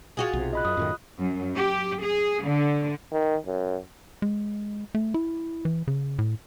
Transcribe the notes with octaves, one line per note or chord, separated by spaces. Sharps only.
F4 F#4 G#4
B1 C3
D#5 B5 F#6
F#2 D#6
F#2 A2 D#3
F#2
G4
G#4
D3
D#3
F#2
G#3
A3
E4
E3
C#3
A2